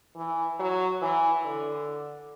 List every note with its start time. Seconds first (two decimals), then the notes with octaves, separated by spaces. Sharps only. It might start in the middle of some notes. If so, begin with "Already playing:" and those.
0.16 E3
0.59 F#3
1.02 E3
1.45 D3